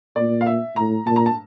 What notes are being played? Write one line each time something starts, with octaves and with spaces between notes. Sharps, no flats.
A#2 D5
F5
E5
A2 A#5
A#2 A5
A#5
A5